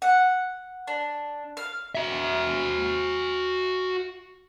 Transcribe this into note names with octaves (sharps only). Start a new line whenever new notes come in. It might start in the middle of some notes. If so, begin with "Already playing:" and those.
F#5
D4
F5
F#4 E5